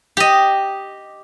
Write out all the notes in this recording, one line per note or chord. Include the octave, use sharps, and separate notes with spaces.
G4 D#5